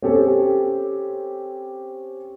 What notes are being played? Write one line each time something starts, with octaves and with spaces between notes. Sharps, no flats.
C4 C#4 G4 A4